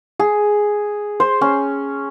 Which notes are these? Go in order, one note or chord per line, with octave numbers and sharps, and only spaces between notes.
G#4
C5
C#4